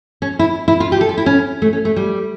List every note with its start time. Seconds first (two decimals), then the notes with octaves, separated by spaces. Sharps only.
0.22 C#4
0.39 E4
0.68 E4
0.80 F4
0.92 G4
1.01 A4
1.09 F4
1.17 E4
1.26 C#4
1.62 A3
1.73 C#4
1.85 A3
1.96 G3